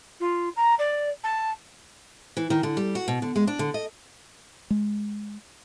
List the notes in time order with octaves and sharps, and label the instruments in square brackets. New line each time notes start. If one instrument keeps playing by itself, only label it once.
[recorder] F4
A#5
D5
A5
[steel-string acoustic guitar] E3
D#3
D3
G3
F#4
B2
D3
G#3
D4
D3
D#5
[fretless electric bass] G#3